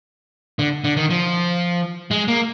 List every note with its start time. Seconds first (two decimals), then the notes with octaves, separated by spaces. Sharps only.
0.59 D3
0.84 D3
0.97 D#3
1.10 F3
2.11 G#3
2.28 A#3